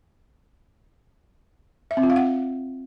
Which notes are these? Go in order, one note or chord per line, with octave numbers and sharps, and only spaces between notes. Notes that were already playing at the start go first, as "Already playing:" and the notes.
E5
C4
F4
F5
F#5